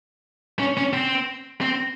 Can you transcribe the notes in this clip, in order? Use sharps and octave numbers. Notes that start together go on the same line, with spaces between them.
C#4
C#4
C4
C4